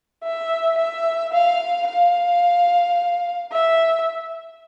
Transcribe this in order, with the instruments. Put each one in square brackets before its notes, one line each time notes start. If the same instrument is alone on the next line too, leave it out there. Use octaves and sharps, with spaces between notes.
[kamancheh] E5
E5
F5
F5
E5